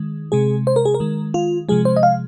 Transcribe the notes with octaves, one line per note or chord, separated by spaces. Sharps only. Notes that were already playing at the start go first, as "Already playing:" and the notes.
Already playing: D#3 G#3
C3 G#3 G#4
C5
A#4
G#4
A#4
D#3 G#3
F4
C3 F3 G#3 G#4
C5
D#5
F5